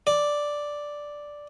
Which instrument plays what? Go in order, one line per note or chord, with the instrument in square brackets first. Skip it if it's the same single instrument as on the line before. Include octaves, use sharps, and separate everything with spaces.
[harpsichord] D5